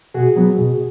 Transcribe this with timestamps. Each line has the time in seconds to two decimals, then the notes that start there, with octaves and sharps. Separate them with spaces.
0.14 B2 F#4 G#4
0.36 F#3 B3
0.58 B2